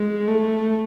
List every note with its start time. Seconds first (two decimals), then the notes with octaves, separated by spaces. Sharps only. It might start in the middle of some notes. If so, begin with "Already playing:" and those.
Already playing: G#3
0.28 A3